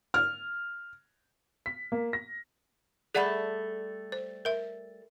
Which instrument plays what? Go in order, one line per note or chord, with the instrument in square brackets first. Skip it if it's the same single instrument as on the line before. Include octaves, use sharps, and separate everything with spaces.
[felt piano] F6
[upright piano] B6
A#3
A#6
[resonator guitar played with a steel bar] G3 A3 A4 [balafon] G#4 D5 F#5
[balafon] C5
A#4 E5